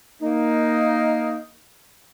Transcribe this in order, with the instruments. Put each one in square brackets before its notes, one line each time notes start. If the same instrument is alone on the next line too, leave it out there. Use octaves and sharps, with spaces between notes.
[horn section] A#3 D#4